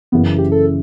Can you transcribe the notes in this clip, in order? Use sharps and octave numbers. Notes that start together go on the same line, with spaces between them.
F#1 F#2 C#3 E3 B3
G4
A4